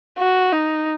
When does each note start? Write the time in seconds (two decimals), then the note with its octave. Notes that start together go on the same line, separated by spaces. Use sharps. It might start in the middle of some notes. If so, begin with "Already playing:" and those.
0.18 F#4
0.53 D#4